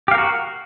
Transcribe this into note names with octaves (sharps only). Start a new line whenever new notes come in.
F#4 G4 A#4 F5